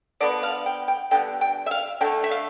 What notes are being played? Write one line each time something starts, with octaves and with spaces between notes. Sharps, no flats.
D3 F3 B3 D5
F5
G5
G5
D3 G3 B3 G5
G5
E5
F5
D3 A3 G5
E5
F5